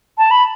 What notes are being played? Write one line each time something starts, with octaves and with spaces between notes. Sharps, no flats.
A5
B5